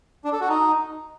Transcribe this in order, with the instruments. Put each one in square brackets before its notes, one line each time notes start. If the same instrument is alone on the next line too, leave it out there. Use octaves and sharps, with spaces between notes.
[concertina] D4
A4
F#4
D#4